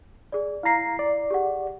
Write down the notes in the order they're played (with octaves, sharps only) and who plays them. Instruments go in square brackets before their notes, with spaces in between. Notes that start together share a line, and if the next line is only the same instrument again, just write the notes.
[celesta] G#4 D5
[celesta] E4 C7 [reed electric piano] F5 A#5
[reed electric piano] D5
[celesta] G4 G#4 F#5